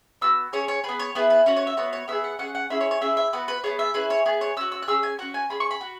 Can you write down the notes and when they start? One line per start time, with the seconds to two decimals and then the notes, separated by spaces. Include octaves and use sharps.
0.22 B3 F#4 E6
0.53 C#4 G#4 C#5
0.68 C#5
0.84 B3 G#4 B4
0.99 C#5
1.15 B3 E4 G#4 B4
1.30 B4
1.46 C#4 F#4 C#5
1.56 C#5
1.67 E5
1.77 B3 F#4 C#5
1.93 C#5
2.08 B3 G#4 E5
2.24 F#5
2.39 C#4 G#4 F#5
2.55 F#5
2.70 C#4 E4 G#4 E5
2.81 C#5
2.91 C#5
3.01 C#4 E4 G#4 E5
3.17 E5
3.33 B3 F#4 B4
3.48 B4
3.64 B3 E4 G#4 C#5
3.79 E5
3.94 C#4 E4 G#4 B4
4.10 C#5
4.25 B3 G#4
4.41 C#5
4.57 C#4 F#4 E6
4.72 E6
4.82 F#6
4.88 C#4 E4 G#4 E6
5.03 G#5
5.19 C#4 F#4 F#5
5.34 G#5
5.50 C#4 G#4 B5
5.60 C#6
5.71 B5
5.81 F#4